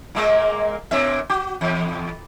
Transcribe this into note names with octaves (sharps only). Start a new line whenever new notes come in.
A#2 G#3 A#3
A#2 B3 E5
F#4
E2